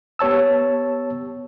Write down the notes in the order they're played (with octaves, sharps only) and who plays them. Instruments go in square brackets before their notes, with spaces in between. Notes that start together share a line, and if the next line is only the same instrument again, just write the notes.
[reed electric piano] B3 G4 C#5 A5 E6